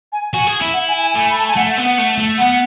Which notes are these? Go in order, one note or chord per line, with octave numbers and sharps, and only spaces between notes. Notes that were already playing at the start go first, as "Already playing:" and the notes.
G#5
F#4 G#5
G#4
E4
F#5
G#5
G#5
A3 G#5
B5
A5
G#5
A3 F#5
F#5
B3
F#5
A3
A3
B3 F#5